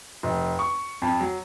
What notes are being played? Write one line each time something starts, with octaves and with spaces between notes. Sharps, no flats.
F1
C#6
F2
F#3